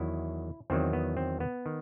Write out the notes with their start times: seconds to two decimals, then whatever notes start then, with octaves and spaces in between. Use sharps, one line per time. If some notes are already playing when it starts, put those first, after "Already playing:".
Already playing: E2 D#3 F#3 E4
0.70 E2 D#3 F#3 C4
0.93 B3
1.17 C4
1.40 B3
1.66 D#3